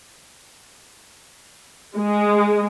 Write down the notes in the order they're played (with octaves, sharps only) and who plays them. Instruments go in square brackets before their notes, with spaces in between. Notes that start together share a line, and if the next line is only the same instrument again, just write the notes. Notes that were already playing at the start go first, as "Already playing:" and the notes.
[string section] G#3